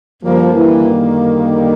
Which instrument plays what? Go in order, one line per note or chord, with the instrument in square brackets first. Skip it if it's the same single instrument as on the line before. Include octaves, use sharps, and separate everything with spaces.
[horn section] F#2 D3 G3 A#3 [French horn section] F3
[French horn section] E3
D#3